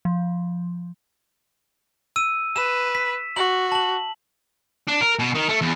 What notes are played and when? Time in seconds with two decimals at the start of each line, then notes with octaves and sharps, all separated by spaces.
0.05 F3
2.16 E6 D#7
2.56 B4 E7
2.95 B6
3.36 F#4 F#7
3.72 A5 F#7
4.88 D4
5.01 A#4
5.19 B2
5.34 D#3
5.48 A3
5.61 E2